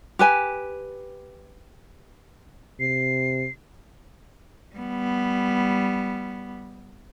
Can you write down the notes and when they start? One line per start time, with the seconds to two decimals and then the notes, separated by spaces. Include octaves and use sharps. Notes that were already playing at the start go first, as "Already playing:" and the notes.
0.19 G4 B4 G#5
2.80 C3 C7
4.76 G3 B3